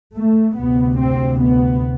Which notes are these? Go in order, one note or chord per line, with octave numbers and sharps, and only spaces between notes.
A3
D2 C3 B3
C4
B3